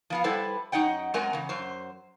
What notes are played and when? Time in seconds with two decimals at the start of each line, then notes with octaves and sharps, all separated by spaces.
0.10 F3 B3 F5
0.24 G3 E4 A4 B4 C5 F#5
0.72 F#2 D#4 D#5 F#5 G5
1.14 F#2 G#3 C4 A#4 F#5 G#5
1.33 E2 C#3
1.49 F#2 C5